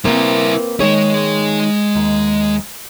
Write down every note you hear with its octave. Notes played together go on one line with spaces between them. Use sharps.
A#3 C4 E4 B4 C5
D#3 G#3 D#4 G#4 C#5
D#2